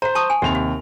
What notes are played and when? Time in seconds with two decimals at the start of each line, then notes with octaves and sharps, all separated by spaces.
0.02 C5 F5 A#5
0.15 A5 C#6 D#6
0.30 G#5
0.42 D#2 C3 G4 F7
0.55 F5